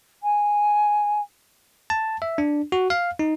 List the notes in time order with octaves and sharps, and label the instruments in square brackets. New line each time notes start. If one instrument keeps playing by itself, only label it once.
[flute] G#5
[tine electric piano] A5
E5
D4
F#4
F5
D#4